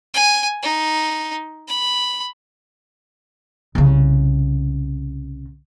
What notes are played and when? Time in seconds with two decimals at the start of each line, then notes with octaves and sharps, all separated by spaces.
0.14 G#5
0.62 D#4
1.68 B5
3.75 C2 C#3